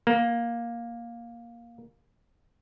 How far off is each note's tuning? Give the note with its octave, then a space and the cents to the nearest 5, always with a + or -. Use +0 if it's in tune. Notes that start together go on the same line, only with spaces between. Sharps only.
A#3 +10